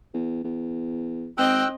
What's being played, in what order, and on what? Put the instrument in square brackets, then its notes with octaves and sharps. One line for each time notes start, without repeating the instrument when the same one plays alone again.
[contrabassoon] E2
E2
[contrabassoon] G#1 [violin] C4 D#5 [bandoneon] G5 E6 F#6